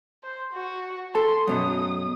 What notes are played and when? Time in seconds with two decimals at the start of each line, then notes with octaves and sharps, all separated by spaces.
0.24 C5
0.53 F#4
1.15 A4 A5 C6
1.47 F#2 B2 F#3 D#6